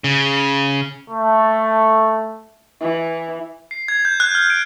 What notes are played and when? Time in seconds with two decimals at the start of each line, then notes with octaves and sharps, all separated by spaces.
0.04 C#3
1.10 A3
2.81 E3
3.71 C7
3.88 G#6
4.05 G6
4.20 F#6
4.35 F6
4.50 D7